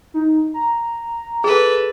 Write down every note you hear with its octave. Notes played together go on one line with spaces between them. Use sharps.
D#4
A#5
G#4 A4 B4